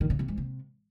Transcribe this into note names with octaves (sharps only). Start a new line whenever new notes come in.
D#3
C#3
C3
G#2
C3